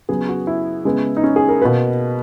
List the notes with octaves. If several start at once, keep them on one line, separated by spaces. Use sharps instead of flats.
C#3 F#3 B3 G#4
F#4
E4
C#3 G#3 B3
D#4
C#4
G#4
A#4
B2 A#3 B4